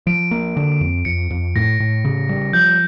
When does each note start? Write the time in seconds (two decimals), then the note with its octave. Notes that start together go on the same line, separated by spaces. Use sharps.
0.07 F3 D7
0.31 A#3
0.57 D3
0.81 F2
1.05 F2 C#7
1.30 F2
1.55 A2 A#6
1.80 A2
2.05 C#3
2.29 G3
2.53 F3 G6